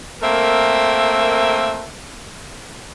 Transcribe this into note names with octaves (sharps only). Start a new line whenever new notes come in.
A3 A#3 C4 A#4 E5